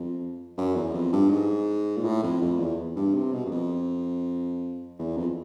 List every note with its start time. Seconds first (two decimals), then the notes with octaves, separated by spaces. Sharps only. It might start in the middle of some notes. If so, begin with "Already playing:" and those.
Already playing: F2
0.58 F#2
0.76 E2
0.94 F2
1.13 G2
1.31 G#2
1.97 A#2
2.04 A2
2.23 F2
2.42 F2
2.59 E2
2.96 G2
3.15 C3
3.33 B2
3.45 F#2
3.51 F2
4.99 E2
5.17 F2